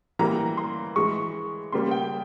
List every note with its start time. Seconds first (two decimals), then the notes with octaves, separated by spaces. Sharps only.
0.19 E3 G3 A#3 A#5
0.57 C6
0.96 E3 G#3 C#6
1.72 C#3 G3 A#3 C6
1.91 G5